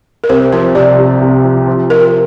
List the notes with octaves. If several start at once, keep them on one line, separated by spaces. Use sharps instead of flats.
A#4
C2 C5
F3 C5
C3 D5
C2
C2
F3
F3
F4 A#4